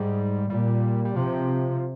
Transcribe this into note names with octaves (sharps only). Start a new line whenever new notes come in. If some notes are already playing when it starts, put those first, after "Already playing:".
Already playing: G#2 G3
A#2 G3
G3
C3 F3